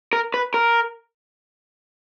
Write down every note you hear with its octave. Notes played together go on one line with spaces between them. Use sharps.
A#4
B4
A#4